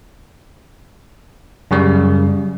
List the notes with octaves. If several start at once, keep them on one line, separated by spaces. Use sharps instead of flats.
F#2 C#3 G3